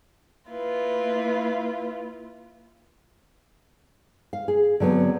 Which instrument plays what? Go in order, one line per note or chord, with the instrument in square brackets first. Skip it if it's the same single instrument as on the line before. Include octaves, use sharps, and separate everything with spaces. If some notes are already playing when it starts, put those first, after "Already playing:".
[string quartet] A#3 E4 F4 B4
[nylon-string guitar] F5
G#4
D3 F#3 B3 C4